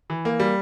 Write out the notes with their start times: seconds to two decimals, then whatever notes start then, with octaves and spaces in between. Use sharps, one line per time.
0.10 E3
0.25 A#3
0.40 G3